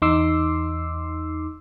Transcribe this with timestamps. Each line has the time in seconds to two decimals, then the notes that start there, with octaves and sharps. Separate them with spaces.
0.02 E2 D#4 C6 D6 E6 C7